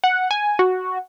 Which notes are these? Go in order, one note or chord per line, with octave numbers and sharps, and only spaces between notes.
F#5
G#5
F#4